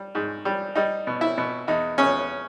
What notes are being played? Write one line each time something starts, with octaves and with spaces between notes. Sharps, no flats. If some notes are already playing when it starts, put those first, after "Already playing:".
Already playing: G3
G#2
G3
G3 D#4
B2
E4
B2
E2 D#4
E2 C#4